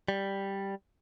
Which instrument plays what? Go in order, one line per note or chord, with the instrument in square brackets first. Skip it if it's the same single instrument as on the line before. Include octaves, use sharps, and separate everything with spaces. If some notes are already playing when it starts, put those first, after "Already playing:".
[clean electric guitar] G3